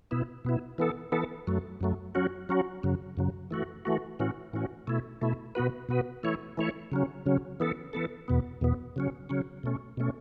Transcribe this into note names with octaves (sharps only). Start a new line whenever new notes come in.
B2 B3 E4
B2 B3 E4
E3 B3 A4
E3 B3 A4
F#2 F#3 A3
F#2 F#3 A3
F#3 C#4 F#4
F#3 C#4 F#4
F#2 C#3 F#3
F#2 C#3 F#3
E3 A3 F#4
E3 A3 F#4
A2 E3 C#4 F#4
A2 E3 C#4 F#4
B2 A3 E4
B2 A3 E4
B2 B3 F#4 B4
B2 B3 F#4 B4
E3 A3 E4 C#5
E3 A3 E4 C#5
C#3 F#3 C#4
C#3 F#3 C#4
E3 B3 A4
E3 B3 A4
E2 B2 B3
E2 B2 B3
C#3 F#3 C#4
C#3 F#3 C#4
B2 A3 C#4
B2 A3 C#4